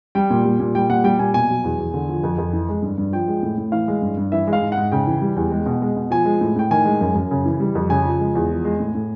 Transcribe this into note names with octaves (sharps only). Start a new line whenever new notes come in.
G3 G5
A#2
G3
A#2
G3 G5
A#2 F#5
G3 G5
A#2 G#5
B2 G#5
F#3
E2
E2
D3
F3
F2
F2
E3
G#3
G2
G2
F3 G5
G#3
A2
A2
E3 F5
G#3
G2
G2
E3 E5
G#3
F5
G#2
F#5
G#2
C#3 G5
E3
G3
E2
G#3
B2
G#3
B2
F3 G#5
G#3
A2
A2 G5
D#3 G#5
G#3
F#2
F#2
C#3
E3
G3
F2
C#3 G#5
F3
G#3
E2
F3
G#3
A2
A2